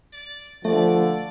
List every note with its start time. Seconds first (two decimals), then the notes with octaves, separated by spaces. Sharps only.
0.13 D5
0.65 D3 F3 A3 D5